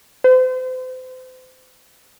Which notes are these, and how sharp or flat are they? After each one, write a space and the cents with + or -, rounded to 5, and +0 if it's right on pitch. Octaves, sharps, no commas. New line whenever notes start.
C5 -35